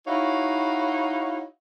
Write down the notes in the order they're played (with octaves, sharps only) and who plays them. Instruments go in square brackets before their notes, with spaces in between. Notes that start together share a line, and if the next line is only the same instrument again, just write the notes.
[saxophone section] D#4 E4 F#4 C#5 F5